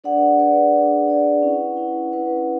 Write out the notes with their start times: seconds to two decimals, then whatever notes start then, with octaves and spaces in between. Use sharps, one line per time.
0.04 D4 G#4 B4 D5 F#5
0.39 D4 G#4 B4 D5 F#5
0.74 D4 G#4 B4 D5 F#5
1.08 D4 G#4 B4 D5 F#5
1.42 C#4 E4 B4 F#5
1.77 C#4 E4 B4 F#5
2.12 C#4 E4 B4 F#5